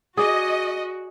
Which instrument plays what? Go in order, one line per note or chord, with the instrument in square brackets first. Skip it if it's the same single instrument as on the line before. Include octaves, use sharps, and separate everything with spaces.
[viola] F#4 [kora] G#4 D5 [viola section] D#5